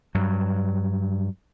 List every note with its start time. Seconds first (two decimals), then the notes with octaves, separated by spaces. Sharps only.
0.15 G2 F#3